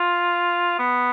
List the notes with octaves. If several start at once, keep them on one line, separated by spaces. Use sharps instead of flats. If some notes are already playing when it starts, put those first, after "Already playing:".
Already playing: F4
B3